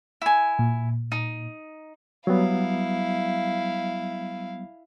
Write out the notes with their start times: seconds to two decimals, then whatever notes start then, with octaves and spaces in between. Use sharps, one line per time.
0.22 E4 G#5
0.59 A#2
1.12 D#4
2.27 F#3 G3 B3 E4 F5